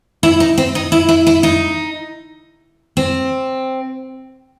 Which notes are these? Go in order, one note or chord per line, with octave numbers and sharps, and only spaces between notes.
E4
D#4
C4
D#4
E4
E4
E4
D#4
C4